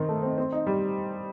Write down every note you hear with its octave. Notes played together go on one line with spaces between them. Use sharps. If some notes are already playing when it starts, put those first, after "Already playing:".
Already playing: D#3 C4 D#4
A3
C4
C4
D#4
G3